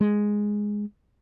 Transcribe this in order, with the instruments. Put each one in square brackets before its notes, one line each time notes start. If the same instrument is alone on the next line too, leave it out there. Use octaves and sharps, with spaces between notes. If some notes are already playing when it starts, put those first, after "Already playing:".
[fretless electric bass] G#3